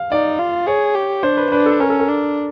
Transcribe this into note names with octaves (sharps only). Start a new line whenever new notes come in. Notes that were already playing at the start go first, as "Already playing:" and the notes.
Already playing: F5
D#4 D5
F4
G#4 C#5
G4
D4 C5
B4
D4 B4
A4
C#4 A#4
A4
A#4
D4